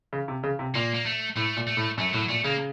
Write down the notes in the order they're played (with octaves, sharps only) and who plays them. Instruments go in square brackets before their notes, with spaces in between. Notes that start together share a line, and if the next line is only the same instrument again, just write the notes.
[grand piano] C#3
C3
C#3
C3
[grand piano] A#2 [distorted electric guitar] A#3
[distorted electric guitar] A#3
A3
[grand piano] A2 [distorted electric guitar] A3
[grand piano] A#2
[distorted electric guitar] A3
[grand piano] A2
[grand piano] F#2 [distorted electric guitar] A3
[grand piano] A2 [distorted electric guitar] F#3
[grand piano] A#2 [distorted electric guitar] A3
[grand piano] C#3 [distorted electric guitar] A#3